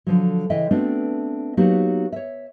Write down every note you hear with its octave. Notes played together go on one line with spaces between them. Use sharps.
D3 F3 F#3
C#3 E3 D#5 E5 G5
A3 B3 C4 D4 F#4
F#3 A#3 B3 D#4 F#4 G4
C#5 E5